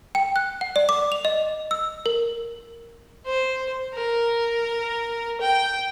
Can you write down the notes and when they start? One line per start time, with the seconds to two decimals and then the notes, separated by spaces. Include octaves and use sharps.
0.15 G5
0.36 F#6
0.61 F#5
0.76 D5
0.89 D6
1.12 F7
1.25 D#5
1.71 E6
2.06 A#4
3.26 C5
3.94 A#4
5.41 G5